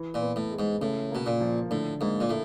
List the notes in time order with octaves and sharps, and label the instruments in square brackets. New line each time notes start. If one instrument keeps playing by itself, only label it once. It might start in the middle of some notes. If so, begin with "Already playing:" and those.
Already playing: [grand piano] E3
[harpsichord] A#2
[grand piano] B3
[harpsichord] A2
[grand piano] G#3
[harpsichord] G#2
[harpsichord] A2 [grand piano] C#3
[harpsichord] B2 [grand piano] A#3
[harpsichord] A#2
[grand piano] F3
[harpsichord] A2 [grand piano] D3
[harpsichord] G#2 [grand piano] A#3
[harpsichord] A#2
A2